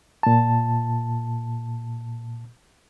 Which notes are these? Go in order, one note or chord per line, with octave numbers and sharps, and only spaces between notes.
A#2 A5